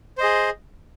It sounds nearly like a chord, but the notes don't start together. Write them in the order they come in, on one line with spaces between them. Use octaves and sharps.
C5 D#5 G#4